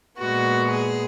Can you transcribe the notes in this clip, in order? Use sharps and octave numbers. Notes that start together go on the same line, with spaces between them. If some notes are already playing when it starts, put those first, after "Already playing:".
A#2 G#3 B3 F#4
G#4